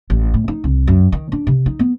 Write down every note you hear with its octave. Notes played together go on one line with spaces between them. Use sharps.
A1
A2
D#4
C2
F#2
D#3
D4
C3
D#4
B3